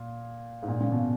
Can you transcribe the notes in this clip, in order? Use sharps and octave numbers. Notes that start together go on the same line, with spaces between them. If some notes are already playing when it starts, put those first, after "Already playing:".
Already playing: A#2
G#2
A#2
A#2 C#3
B2